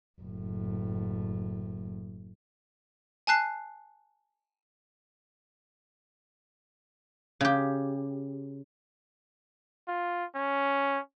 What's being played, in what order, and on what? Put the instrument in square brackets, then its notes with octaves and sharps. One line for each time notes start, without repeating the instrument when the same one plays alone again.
[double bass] F#1 A2
[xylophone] G#5 A5 F#6 C7
[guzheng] C#3 G4
[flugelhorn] F4
C#4